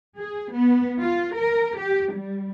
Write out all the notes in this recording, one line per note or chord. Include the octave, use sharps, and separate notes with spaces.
G#4
B3
F4
A#4
G4
G3